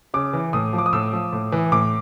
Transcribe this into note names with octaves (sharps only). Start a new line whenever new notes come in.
C#3 D6
E3
A2 D#6
F3
D6
D#6
A2 E6
F3
A2
E3
A2 D6